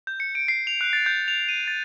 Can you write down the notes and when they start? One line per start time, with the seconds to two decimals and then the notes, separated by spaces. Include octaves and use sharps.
0.07 G6
0.20 C#7
0.35 D7
0.48 C7
0.67 F7
0.81 F#6
0.93 A6
1.06 G6
1.28 F7
1.49 D#7
1.68 A6